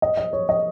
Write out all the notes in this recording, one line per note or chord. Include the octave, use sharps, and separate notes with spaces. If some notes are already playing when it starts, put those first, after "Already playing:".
D#5
D#5
C#5
D#5